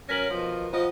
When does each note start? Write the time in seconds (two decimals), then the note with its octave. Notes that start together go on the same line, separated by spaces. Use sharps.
0.09 F#3 C#4 A#4 A#6 B6 F#7
0.30 B2 D#3 F3
0.73 F3 F4 F#4 C5 D#5